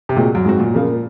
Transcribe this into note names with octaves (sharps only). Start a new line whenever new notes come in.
C3
A#2 G#3 C4 F#4
F#2
G#2 G#3 C4 F#4
A#2
C#3 F3 A#3